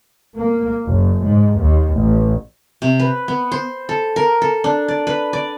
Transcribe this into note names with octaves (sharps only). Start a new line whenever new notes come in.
A#3
F#1
G#2
D#2
A1
C3
B4
B3
C5
A4
A#4
A4
D4
D5
B4
D5